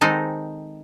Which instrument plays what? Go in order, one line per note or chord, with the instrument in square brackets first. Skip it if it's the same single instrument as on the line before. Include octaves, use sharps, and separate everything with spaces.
[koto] D#3 G#3 C4 D#4 A4 C5